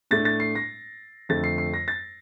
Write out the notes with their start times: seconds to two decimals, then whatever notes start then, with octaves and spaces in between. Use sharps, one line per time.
0.11 A2 A3 D4 A6
0.25 A6
0.40 C7
0.56 A#6
1.29 F2 D3 A3 A6
1.44 C7
1.58 C7
1.74 A#6
1.88 A6